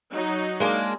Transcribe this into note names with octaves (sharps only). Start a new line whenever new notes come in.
F#3 D#4
G#3 A#3 D4